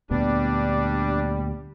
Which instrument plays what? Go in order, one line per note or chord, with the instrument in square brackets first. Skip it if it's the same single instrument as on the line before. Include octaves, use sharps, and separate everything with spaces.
[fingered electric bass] D2 A#2 B3 [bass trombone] G3 [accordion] D4